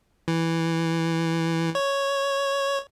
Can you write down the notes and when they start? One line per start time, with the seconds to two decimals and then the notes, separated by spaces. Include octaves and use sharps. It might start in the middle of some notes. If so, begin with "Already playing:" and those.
0.28 E3
1.75 C#5